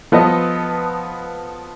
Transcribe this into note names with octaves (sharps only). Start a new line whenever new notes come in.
F3 B3 A4 B4 D#5